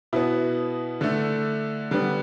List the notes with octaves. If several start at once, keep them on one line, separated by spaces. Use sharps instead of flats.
B2 B3 E4
D3 A3
D3 G3 B3